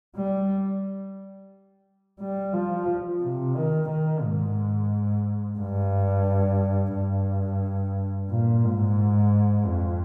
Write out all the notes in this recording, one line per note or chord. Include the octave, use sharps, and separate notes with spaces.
G3
G3
F3
C3
D#3
D#3
G#2
G2
G2
A#2
G#2
F2